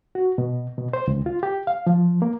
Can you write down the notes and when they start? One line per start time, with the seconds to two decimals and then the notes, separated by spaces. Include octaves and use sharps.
0.15 F#4
0.38 B2
0.77 B2
0.93 C5
1.07 C#2
1.26 F4
1.43 G4
1.67 F5
1.87 F3
2.22 A#3